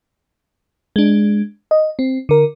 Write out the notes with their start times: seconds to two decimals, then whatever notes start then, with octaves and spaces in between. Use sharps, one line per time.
0.96 G#3 D4
1.71 D#5
1.99 C4
2.29 D3 A#4